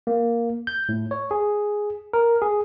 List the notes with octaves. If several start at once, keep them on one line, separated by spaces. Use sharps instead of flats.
A#3
G6
A2
C#5
G#4
A#4
G#4